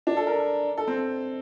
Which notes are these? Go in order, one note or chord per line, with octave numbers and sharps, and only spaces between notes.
D4
A4
A#4
A4
C4